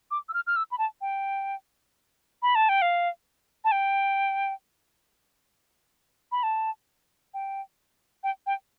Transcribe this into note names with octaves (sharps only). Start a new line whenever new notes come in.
D6
E6
F6
F6
E6
B5
A5
G5
B5
A5
G5
F5
A5
G5
B5
A5
G5
G5
G5